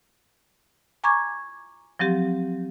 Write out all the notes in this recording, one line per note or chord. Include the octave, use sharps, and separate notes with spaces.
G#5 A#5 C#6 D6 G#6
F3 F#3 C4 G4